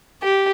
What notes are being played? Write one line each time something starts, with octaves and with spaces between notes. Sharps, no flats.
G4